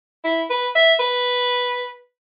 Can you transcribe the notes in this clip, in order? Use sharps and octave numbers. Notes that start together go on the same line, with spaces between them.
E4
B4
E5
B4